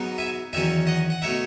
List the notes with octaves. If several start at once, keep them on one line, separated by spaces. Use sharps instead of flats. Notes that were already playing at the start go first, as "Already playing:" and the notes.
Already playing: G#2 F#3 B3 D#4
E5 G#5
E2 D#3 F#3 C#4 E5 G#5
D#5 F#5
F#5
B2 A3 D#4 C#5 E5